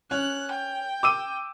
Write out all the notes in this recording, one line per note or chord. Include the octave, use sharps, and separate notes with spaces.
C#4 F#6
G5
D6 E6 D#7